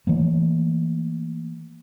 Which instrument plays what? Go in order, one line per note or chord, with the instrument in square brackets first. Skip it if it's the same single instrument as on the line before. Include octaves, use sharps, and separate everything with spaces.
[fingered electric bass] E3 A3 A#3